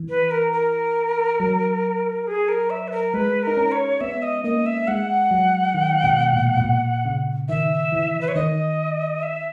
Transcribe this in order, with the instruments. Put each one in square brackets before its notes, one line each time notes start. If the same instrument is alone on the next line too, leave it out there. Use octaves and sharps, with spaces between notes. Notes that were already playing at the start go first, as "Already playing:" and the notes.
Already playing: [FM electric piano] E3
[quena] B4
A#4
A#4
[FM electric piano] F#3
[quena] G#4
A#4
E5
B4
A#4
[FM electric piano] G#3 [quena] B4
[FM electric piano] D#4 [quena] A#4
[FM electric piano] C#4
[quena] C#5
[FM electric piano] B3 [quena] E5
[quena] D#5
[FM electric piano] A#3 [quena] D#5
[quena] E5
[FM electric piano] G#3 [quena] F#5
[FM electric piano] F#3
D#3
B2
A#2
B2
A#2
C#3
[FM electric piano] D#3 [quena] E5
[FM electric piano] E3
[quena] B4
C#5
[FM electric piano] D#3 [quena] D#5
[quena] E5